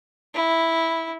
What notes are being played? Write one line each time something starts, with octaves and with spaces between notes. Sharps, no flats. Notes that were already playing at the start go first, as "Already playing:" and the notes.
E4